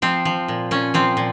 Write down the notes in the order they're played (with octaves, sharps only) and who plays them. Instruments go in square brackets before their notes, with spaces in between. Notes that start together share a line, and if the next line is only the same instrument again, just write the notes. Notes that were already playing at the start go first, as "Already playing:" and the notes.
[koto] F3 C4
F3
A#2
A#2 C#4
F3 C4
A#2